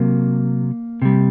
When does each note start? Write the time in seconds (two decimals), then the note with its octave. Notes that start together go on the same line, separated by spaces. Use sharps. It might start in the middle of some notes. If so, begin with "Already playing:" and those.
Already playing: C3 F#3 A#3
1.02 C3 G3